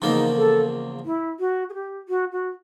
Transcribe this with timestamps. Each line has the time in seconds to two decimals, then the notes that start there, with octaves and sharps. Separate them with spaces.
0.01 E2 C#3 F3 A#3 D#4
0.36 A4
1.05 E4
1.40 F#4
1.69 G#4
1.74 G4
2.09 F#4
2.32 F#4